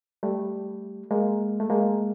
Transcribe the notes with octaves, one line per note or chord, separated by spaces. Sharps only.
G3 A3
G#3 A#3
A3
G#3 A#3